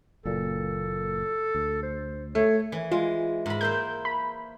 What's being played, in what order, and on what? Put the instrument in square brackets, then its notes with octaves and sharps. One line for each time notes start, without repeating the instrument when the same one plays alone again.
[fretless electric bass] F#1 F#2 A#2 [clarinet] A4
[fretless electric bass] D2
[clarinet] C5
[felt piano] A3 [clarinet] C#5
[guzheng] E3
[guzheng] G#3 [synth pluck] F4
[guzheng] G#2 B5
[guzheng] A#3 E4 C5 [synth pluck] G6
[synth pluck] B5